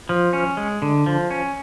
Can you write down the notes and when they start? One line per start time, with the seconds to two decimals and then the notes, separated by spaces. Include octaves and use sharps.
0.09 F3
0.33 C#4
0.57 G#3
0.82 D3
1.06 F3
1.31 C#4